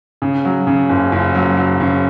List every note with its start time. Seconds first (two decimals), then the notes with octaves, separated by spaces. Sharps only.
0.22 C#3
0.45 F#3
0.67 C#3
0.90 F#1
1.12 F#1
1.35 F#3
1.57 F#3
1.80 C#3